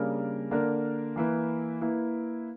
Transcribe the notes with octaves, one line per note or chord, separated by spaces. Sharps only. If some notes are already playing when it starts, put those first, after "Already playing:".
Already playing: C#3 G3 A#3 D4 A#4
D3 A#3 D4 A#4
E3 A#3 E4 B4
A#3 E4 B4